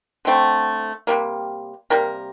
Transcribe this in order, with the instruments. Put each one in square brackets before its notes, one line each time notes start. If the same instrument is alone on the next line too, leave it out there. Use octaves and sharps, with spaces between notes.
[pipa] D3 A3 C4
C3 G3 A#3
C3 G3 A#3 A#4